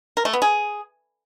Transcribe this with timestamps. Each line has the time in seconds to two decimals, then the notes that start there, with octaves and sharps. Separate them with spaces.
0.17 A#4
0.25 A3
0.33 B3
0.42 G#4